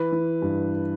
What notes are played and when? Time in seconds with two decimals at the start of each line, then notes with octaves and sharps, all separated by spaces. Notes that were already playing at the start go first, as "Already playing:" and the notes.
Already playing: E3 B4
0.12 E3
0.42 G2